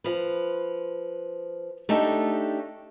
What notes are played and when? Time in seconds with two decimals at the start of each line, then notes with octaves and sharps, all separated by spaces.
0.04 F3 B4
1.89 A3 D4 D#4 G4 A4